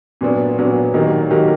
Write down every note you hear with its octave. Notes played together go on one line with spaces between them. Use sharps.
A#2 F#3 B3 D4
A#2 F#3 B3 D4
D#3 F#3 A#3 D#4 G4
D#3 F#3 A#3 D#4 G4